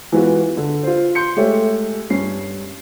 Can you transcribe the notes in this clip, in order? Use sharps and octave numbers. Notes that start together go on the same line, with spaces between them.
E3 G#3 B3 F4 F#4
D3
F4 C5
C6 G6 C#7
G#3 A3 G4 A4 C#5 E5
G2 C#4 C7